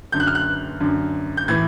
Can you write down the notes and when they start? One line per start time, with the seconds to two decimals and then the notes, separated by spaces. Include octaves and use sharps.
0.12 F#2 D3 G6
0.20 F#6
0.27 F6
0.35 F#6
0.80 F#2 D3
1.37 G6
1.48 A2 E3 G#6